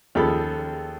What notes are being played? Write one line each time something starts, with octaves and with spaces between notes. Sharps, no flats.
D#2 F3 C#4 G#4 A4 B5